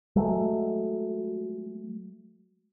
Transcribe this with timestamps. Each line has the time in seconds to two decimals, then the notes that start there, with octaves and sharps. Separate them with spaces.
0.16 F#3 G#3 A3